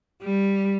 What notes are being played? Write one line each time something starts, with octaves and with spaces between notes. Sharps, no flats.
G3